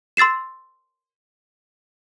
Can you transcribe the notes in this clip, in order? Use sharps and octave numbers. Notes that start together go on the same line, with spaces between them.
C6 E6 A6 C7 E7